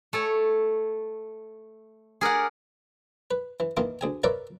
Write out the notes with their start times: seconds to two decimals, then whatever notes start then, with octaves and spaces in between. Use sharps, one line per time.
0.13 A3 A4 C#5
2.21 G#4 A#4 D5 F#5
3.31 B4
3.60 E3
3.77 D#3 E3 A#3 D#4 F4
4.01 D2 G#4 G#5
4.24 F4 A#4 B4 C#5 D5 E5